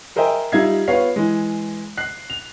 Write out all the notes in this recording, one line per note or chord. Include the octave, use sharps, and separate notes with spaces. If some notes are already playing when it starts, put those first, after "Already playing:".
G#4 A#4 C5 D#5 E5 G5
G3 D#4 F4 E5 G#6 C7
B3 F4 C#5 F5 C7
E3 G#3
F#6 C7
F7